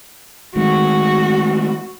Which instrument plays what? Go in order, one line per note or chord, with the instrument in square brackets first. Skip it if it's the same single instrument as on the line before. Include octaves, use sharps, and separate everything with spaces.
[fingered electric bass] D#3 G#3 A3 [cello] F#4